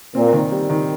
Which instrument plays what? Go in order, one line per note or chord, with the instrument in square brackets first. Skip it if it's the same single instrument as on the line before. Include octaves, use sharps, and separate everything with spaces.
[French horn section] A#2 [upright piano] C4
[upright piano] D#3
G3
D#3